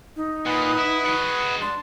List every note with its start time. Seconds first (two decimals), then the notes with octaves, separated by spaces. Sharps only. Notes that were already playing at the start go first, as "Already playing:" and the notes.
0.16 D#4
0.46 A#2 B4 F#5 D#6
0.78 E4
1.05 G#3 F#4
1.62 D4 A5 C6